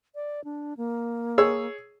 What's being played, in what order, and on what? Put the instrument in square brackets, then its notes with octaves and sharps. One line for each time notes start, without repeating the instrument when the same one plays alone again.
[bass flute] D5
D4
A#3
[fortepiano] G#4 C#5 E6